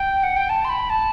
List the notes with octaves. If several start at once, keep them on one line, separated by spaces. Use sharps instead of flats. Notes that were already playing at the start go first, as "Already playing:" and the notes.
Already playing: G5
F#5
G5
A5
C6
B5
A5